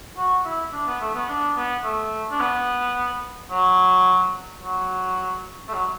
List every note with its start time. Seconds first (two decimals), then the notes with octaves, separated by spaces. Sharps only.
0.17 F#4
0.45 E4
0.73 D4
0.87 B3
1.01 A3
1.15 B3
1.29 D4
1.56 B3
1.84 A3
2.32 D4
2.40 B3
3.51 F#3
4.62 F#3
5.69 A3
5.73 F#3